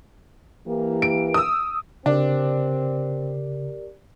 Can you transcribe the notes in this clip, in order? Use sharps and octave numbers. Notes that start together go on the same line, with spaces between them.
E3 A#3 G4
D7
D#6 E6
C#3 C4 D4 G4 A#4 D5